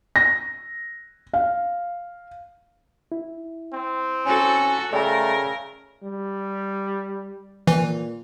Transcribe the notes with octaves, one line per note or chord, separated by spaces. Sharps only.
A#6
F5
E4
C4
C#4 F#4 A4
C#3 A3 A#4 D5 G5 A#5
G3
A#2 E3